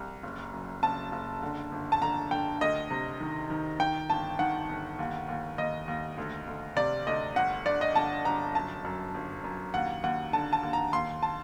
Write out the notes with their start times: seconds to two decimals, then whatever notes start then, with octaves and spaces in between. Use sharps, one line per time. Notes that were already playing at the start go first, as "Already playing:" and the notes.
Already playing: C2
0.23 F#1
0.53 F#2
0.83 F#1 A5
1.12 F#1
1.43 D3
1.72 G1
1.92 A5
2.02 D3 A#5
2.31 D3 G5
2.61 D2 D#5
2.91 C3
3.20 D#3
3.50 D#3
3.80 D#3 G5
4.09 G1 A5
4.39 D#3 F#5
4.69 G1
4.99 D#2
5.28 D#2
5.58 D#2 D#5
5.88 D#2
6.18 D2
6.47 D2
6.76 C3 D5
7.07 D2 D#5
7.36 G1 F#5
7.66 D3 D5
7.81 D#5
7.95 G1 A5
8.25 G1 A#5
8.55 F#2 A5
8.85 F#2
9.14 G1
9.44 F#2
9.74 D#2 F#5
10.03 D#2 F#5
10.33 D3 A5
10.53 A5
10.63 D#2
10.73 A#5
10.93 D#2 C6
11.22 A5